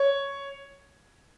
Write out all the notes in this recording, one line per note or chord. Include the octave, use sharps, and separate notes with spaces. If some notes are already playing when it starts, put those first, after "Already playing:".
Already playing: C#5